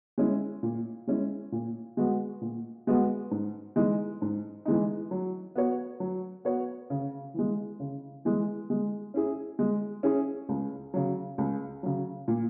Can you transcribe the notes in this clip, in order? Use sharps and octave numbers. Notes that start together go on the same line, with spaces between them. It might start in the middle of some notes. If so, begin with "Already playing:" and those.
G#3 C#4 E4
A#2
G#3 C#4 E4
A#2
G#3 B3 F#4
A#2
G#3 B3 F#4
G#2
E3 G#3 D#4
G#2
E3 G#3 D#4
F#3
B3 F#4 C#5
F#3
B3 F#4 C#5
C#3
E3 G#3
C#3
E3 G#3
G#3
C#4 E4 G#4
G#3
C#4 E4 G#4
C#2
C#3 F#3
C#2
C#3 F#3
A#2